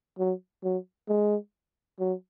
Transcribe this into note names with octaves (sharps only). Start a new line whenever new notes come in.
F#3
F#3
G#3
F#3